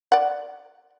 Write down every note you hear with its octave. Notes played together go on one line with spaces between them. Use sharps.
D5 F#5